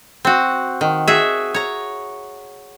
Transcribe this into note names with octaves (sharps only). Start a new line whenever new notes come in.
C4 F#4
D#3
F#4 G#4 E5
C#5 A#5